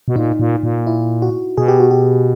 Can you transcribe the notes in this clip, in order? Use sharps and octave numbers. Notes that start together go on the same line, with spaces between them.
B2
A#2 D#4
A#2
A#2
E4
F#4
B2 G#4
G4
F#4
G4